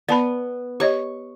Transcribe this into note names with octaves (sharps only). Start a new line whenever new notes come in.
B3 D5 A5 B5
G4 C#5 D#5 C#6